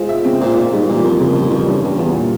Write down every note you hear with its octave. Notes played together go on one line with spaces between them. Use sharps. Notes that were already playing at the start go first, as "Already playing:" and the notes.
Already playing: G#3 F4 C5
E5
C#3 C4
A#2 C5
A#2 F4
G#2 G3
A#2 E3
F2 A#3
F2 C#3
F2 G3
F2 E3
G2 C#4
G2 G3
E2 F4
A#2